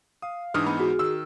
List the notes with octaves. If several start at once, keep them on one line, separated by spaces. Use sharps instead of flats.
F5 D#6
G#2 E3 D4 D#4 D#6 F6
B3 B5
F#4 G#4
D#3 E6